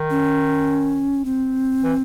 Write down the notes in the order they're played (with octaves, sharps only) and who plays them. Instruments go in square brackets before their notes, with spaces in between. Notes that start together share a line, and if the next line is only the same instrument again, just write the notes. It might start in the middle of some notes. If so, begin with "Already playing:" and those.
Already playing: [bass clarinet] D#3
[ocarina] C#4
C4
[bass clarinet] E3